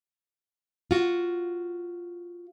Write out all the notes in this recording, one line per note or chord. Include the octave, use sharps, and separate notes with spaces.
F4 F#4